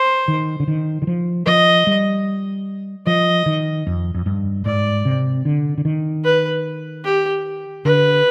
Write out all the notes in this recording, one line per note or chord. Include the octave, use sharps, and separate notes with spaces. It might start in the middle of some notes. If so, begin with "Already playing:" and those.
Already playing: C5
D#3
D3
D#3
D#3
F3
F3 D#5
G3
F3 D#5
D#3
F2
F2
G2
G#2 D5
C3
D3
D3
D#3
B4
G4
D3 B4